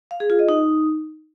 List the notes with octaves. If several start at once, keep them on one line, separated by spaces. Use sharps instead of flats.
F5
G#4
F4
D#5
D#4